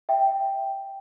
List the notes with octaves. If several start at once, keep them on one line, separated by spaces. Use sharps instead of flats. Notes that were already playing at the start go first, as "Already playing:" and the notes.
E5 G5